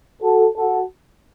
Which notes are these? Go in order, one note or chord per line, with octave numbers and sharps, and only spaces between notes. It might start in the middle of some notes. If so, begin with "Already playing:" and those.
F#4 A4
F#4 A4